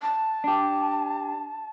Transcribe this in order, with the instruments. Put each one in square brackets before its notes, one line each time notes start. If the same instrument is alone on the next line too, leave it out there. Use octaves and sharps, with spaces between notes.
[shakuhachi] A5
[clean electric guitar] D4 G4